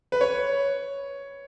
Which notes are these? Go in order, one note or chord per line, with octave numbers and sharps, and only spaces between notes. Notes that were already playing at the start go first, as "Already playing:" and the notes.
B4
C#5